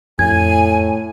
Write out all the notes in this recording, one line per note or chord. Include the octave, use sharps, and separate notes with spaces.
F2 A2 G#5 G#6